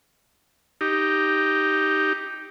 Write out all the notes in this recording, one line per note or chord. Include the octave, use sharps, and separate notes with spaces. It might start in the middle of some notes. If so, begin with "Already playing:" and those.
D#4 G4